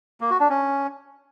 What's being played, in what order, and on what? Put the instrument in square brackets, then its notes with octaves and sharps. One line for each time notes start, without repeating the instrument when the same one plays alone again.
[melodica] A#3
F#4
D4
C#4